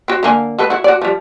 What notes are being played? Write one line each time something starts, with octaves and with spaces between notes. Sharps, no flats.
C4 F#4
D3 A#3 G#5
G#3 A4 B4
E4 F#4
F#4 D5
F3 G3